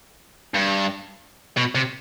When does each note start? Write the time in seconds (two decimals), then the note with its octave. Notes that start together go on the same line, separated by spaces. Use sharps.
0.54 G2
1.57 B2
1.75 C3